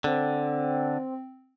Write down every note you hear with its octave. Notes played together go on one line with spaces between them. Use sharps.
D3 C4